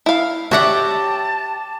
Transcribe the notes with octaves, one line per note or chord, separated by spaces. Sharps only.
E4 F5
F#4 G4 C#5 D5 E5 F#5 A5